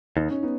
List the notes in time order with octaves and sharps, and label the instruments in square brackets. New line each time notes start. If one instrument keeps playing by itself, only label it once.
[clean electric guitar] D#2 [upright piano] D#4
[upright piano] C#4
B3 D#4